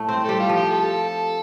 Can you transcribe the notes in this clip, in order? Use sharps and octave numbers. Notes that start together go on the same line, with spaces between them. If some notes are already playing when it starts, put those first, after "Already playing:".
Already playing: A2 A3
C4 C5
G3 A4
F4
F3
G4
A4